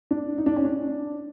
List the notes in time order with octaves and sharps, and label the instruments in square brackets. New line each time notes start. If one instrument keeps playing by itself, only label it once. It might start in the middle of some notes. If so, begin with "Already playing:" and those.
[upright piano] D4
D#4
D4
C#4
D4